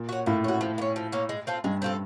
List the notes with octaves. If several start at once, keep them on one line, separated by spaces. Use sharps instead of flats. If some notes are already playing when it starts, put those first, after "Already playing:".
Already playing: A#2
C#4 F#4
A2 A#3
C#4 F#4
F3
A#3
C#4
F3
A#3 C#4
G#3
C4 F4 A4
G2 G#3
C4 F4 A4